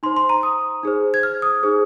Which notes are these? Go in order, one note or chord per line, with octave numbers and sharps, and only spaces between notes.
D#4 C5 C6
C6
A#5
D#6
D#4 G#4 C5
G#6
F6
D#6
D#4 G#4 C5